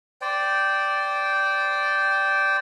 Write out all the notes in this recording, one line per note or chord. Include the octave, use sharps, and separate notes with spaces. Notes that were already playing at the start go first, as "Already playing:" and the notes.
C5 D5 G5